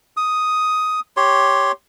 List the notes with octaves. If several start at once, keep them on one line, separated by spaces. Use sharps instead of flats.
D#6
G4 C#5 C6